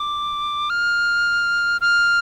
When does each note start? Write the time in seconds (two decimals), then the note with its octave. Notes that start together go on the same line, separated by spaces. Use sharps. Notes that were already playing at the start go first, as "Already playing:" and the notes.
Already playing: D6
0.70 F6
1.81 F6